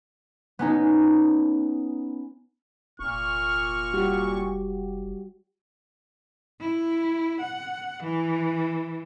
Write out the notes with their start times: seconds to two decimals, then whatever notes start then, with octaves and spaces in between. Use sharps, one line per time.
0.59 B3 C#4 D#4
3.00 F1 A#2 C#6 F6
3.93 G3 F#4 G4
6.61 E4
7.41 F#5
8.04 E3